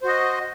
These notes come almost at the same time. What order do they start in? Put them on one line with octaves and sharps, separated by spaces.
C5 F#4 D#5